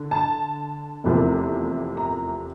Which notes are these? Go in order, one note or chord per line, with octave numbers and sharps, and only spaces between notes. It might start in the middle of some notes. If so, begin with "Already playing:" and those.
Already playing: D3
A5
F1 E2 C3 F3 A#3
A#5